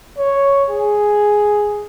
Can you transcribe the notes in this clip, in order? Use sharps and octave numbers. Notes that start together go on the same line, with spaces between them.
C#5
G#4